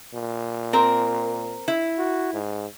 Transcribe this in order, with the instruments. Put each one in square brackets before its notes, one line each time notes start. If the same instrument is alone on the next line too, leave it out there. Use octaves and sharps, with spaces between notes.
[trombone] A#2
[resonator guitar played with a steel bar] C4 A#4
E4
[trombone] F#4
G#2